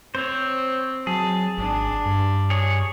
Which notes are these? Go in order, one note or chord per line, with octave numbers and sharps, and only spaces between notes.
C4 C5 C#5
F#3 G#4 A5
G#1 D4
G2
G#4 C#5